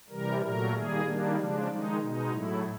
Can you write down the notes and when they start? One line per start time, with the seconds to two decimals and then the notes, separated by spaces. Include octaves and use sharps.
0.10 C3 E3 G3 A#4
0.41 A#2 F#3 A3 A#4
0.73 D#3 G3 A#3 G#4
1.04 D#3 G3 A#3 D4
1.37 C#3 F3 G#3 D4
1.68 D#3 G#3 D#4
2.00 B2 G#3 D#4
2.32 A2 F#3 A3 E4